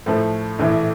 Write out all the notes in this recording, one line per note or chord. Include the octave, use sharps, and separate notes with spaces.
A2 F3 A3
A#1 A2 E3 A3